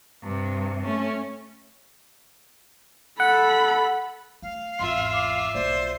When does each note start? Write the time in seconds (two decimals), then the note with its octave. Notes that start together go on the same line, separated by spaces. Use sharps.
0.23 G2 C3
0.85 A3 C#4
3.20 A4 F#5 B5
4.42 A3 F5
4.79 G#1 E2 F4 E5 C6
5.13 D6
5.54 B1 A#3 C5 D5